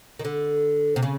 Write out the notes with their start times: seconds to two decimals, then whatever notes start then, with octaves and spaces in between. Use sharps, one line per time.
0.19 D#3
0.25 D3
0.96 C3
1.03 C#3